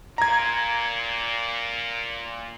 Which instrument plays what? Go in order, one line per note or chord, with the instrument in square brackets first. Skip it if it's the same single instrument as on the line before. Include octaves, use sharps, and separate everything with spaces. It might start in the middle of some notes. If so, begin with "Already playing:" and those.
[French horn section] A#2 [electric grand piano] A#5 G#6